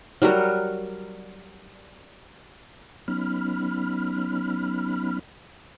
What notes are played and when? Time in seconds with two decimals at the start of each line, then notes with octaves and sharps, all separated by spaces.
0.22 F#3 G3 F#4 A#4
3.08 F#3 B3 C#4 D#4 B5 F6